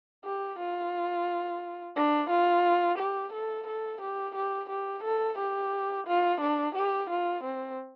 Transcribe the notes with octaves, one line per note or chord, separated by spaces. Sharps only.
G4
F4
D4
F4
G4
A4
A4
G4
G4
G4
A4
G4
F4
D4
G4
F4
C4